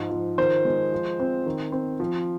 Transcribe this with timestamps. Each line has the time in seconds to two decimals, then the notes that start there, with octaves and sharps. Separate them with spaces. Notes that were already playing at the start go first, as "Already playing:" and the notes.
Already playing: G#2 F3
0.10 F3
0.38 D#3 C5
0.65 G#3
0.92 F3
1.20 C4
1.46 D#3
1.72 C4
2.00 F3